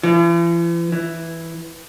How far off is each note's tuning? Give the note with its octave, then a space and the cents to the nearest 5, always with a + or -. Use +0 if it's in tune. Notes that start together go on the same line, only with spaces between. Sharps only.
E3 +45
E3 +0